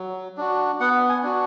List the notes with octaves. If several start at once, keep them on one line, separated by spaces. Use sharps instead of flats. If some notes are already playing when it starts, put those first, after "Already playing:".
Already playing: F#3
D4 F#4
B3 F#5
G#5
D4 F#4